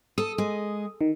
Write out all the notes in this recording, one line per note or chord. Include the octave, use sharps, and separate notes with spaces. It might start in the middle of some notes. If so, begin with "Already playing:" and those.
A4 D#6
G#3
D#3